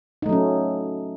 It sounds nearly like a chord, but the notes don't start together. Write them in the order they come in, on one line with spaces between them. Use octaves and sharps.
D#4 A3 F#3 C#4